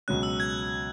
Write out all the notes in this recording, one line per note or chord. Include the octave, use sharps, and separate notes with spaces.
C#2 B2 F#3 C#4 F#6
E6
G#6